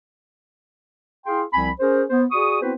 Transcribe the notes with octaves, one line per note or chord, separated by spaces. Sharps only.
E4 G#4 F5 G5 C6
C2 F3 C4 G#5 B5
C#4 G#4 A#4 C5
B3 C5
F#4 G#4 D5 C#6 D#6
B3 C4 E4 F#4 B4 C5